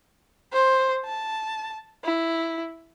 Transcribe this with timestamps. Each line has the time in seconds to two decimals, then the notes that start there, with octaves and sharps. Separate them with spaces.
0.53 C5
1.05 A5
2.04 E4